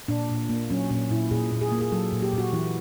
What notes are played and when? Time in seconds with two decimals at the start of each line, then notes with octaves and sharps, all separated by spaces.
0.08 A#2 D4
0.29 A#2
0.49 A#3
0.70 F#3 C#4
0.90 A#2 C#4
1.11 A#2 E4
1.31 A#2 G#4
1.52 A#2
1.61 G#4
1.72 A#3
1.81 G#4
1.92 F#3 A4
2.12 A#2
2.22 G4
2.33 A#2 F#4
2.53 E3 E4